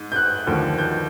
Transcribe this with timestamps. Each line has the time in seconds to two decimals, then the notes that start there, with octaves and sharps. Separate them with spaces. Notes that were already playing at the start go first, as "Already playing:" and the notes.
Already playing: G#2
0.12 G6
0.16 F#6
0.47 D#2 D3 F3
0.78 G6